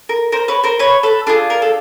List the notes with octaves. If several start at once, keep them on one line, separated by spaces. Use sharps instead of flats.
A#4
A#4 C5
B4 C#5
A#4 C5
B4 C#5
A4 B4
D4 F4 G#4 A4
A#4
A4